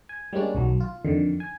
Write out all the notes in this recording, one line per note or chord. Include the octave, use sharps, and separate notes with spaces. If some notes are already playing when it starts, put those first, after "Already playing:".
G#5
G3 G#3 A#3 C#4 D4
B1 D#3 F#3
F4
F2 D3 D#3
G#5